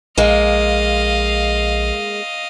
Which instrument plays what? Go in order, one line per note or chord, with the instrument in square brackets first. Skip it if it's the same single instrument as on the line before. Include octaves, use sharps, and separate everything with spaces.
[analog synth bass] A#1 [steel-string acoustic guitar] G#3 A#3 [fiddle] D#5 F5